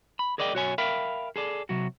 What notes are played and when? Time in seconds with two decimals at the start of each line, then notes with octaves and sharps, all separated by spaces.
0.19 B5
0.38 G#4 A#4 D5 D#5 F#5 G5
0.53 B1 F#4 C#5 G#5
0.78 A#4 E5 F5 G5 B5
1.36 G#4 A4 D5
1.69 C3 F#3 F#4